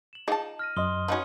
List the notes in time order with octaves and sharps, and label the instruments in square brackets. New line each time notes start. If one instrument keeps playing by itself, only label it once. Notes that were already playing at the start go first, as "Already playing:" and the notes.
[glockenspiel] E7 F#7
[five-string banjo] D#4 A5 [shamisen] F4 G#4 D5
[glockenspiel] F6 A#6 D#7
[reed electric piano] F#2 D#5 [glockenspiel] C6 D#6 G7
[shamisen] F3 F#4 [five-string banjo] C#4 D#4 B4